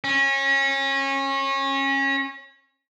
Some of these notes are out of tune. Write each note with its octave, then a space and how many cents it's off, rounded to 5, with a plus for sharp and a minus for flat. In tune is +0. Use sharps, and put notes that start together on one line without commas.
C#4 -25